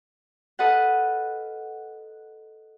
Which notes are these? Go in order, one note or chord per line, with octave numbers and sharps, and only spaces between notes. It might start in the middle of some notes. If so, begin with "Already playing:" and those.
A4 B4 D#5 F5 F#5